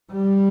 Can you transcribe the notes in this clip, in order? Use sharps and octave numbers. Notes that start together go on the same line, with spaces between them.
G3